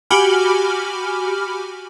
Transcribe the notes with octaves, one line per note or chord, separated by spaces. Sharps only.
F#4 G4 G#5 B5 D6 F6